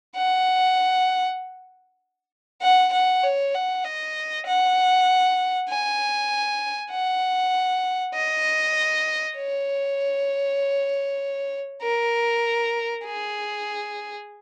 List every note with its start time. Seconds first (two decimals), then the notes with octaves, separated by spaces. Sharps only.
0.16 F#5
2.62 F#5
2.92 F#5
3.23 C#5
3.54 F#5
3.84 D#5
4.46 F#5
5.69 G#5
6.91 F#5
8.14 D#5
9.36 C#5
11.82 A#4
13.04 G#4